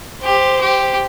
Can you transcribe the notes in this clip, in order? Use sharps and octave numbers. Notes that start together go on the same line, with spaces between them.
G4 C5
G4